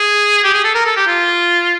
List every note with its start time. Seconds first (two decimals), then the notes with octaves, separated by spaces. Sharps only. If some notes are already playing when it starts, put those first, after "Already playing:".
Already playing: G#4
0.44 G4
0.54 G#4
0.64 A4
0.75 A#4
0.86 A4
0.97 G4
1.07 F4